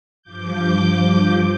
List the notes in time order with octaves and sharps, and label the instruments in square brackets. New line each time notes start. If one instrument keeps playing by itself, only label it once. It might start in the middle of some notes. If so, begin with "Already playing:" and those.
[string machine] G2 F3 D6 G6